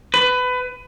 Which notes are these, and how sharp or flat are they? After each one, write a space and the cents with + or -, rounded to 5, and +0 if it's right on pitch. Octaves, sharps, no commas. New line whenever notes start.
B4 +20